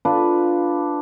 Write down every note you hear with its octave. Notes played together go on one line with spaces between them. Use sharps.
D4 F4 B4